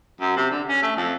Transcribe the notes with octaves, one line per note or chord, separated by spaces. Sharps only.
F#2
C3
D3
C#4
A3
F2